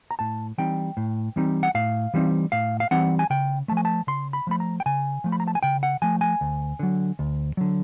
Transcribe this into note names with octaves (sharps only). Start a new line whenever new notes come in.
A#5
A2 A5
E3 G3 C4 D#4 G5
A2
E3 G3 C4 D#4
F#5
A2 F5
E3 G3 C4 D#4
A2 F5
F5
E3 G3 C4 D#4 F#5
G#5
C#3 G5
F3 A3 A5
G#5
A5
C#3 C6
B5
F3 A3 B5
A#5
G5
C#3 G#5
F3 A3
B5
A#5
A5
G#5
C#3 G5
F#5
F3 A3 G#5
G#5
D2
D3 F#3
D2
D3 F#3